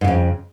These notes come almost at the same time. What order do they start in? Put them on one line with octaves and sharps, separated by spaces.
G#2 C#3 F2